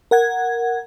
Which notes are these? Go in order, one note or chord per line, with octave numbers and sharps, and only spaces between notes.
A#4 F#5 G#6